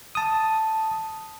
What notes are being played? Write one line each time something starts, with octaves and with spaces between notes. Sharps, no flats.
A5 D#6